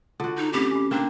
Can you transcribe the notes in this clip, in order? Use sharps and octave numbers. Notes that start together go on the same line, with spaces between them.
D3 F4 F#4
D#4
A3 C4 C#4 G4
C#4 G#5
A#3 C4 D4